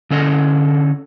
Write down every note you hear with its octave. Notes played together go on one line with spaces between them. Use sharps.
D3 C#4 A4 D#5